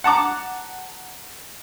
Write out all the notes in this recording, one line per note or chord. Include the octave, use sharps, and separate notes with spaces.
F#5 A5 A#5 D6